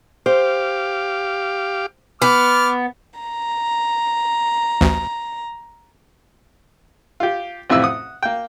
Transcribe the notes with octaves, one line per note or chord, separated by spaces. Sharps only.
G4 C5 F5 D6
B3 D6 F6
A#5
A1 D2
F4 G4
A1 F2 C3 E4 E6
F#5 D#6
A#3 G5